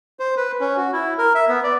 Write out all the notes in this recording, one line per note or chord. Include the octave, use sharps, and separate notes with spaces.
C5
B4
C#4
F#4
E4
A#4
E5
B3
D5